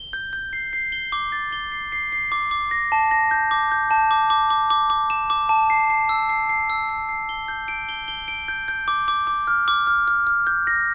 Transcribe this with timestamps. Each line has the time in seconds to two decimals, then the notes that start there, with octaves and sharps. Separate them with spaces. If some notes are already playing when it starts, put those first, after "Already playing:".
Already playing: G7
0.13 G6
0.33 G6
0.53 C7
0.73 C7
0.92 G7
1.12 D6
1.32 A6
1.53 G7
1.72 C7
1.92 C7
2.12 C7
2.32 D6
2.51 D6
2.71 A#6
2.92 A5
3.11 A#6
3.31 G6
3.51 D6
3.72 G6
3.91 A5
4.11 D6
4.30 D6
4.50 D6
4.70 D6
4.90 D6
5.10 E7
5.30 D6
5.49 A5
5.70 C7
5.90 C7
6.09 E6
6.29 C7
6.49 C7
6.70 E6
6.89 C7
7.09 C7
7.29 G7
7.48 G6
7.68 D7
7.89 G7
8.08 G7
8.28 D7
8.48 G6
8.68 G6
8.88 D6
9.08 D6
9.27 D6
9.47 F6
9.68 D6
9.87 F6
10.08 F6
10.27 F6
10.47 G6
10.67 A#6